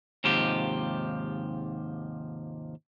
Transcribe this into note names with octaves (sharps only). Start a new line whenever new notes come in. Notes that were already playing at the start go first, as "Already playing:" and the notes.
D#2 G#2 C3 F3 G4